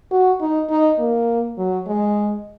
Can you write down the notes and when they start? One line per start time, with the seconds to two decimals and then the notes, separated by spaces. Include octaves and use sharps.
0.11 F#4
0.41 D#4
0.70 D#4
0.99 A#3
1.58 F#3
1.87 G#3